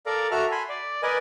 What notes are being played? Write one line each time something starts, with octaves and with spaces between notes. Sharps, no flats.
A4 A#4 D5 F5 A#5
F#4 A4 E5 A#5 F6
G#5 B5 C6
D5
A#4 B4 D5 D#5 G#5